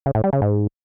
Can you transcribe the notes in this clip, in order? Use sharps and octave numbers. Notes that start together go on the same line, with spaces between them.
C#3
A2
G3
C#3
G#2